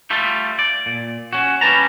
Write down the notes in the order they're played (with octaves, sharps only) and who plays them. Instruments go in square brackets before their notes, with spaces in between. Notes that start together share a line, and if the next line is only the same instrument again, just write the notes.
[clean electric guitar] G3 A3 F4
D5
A#2
C#4 F#4
G3 C#4 B4 A5 A#5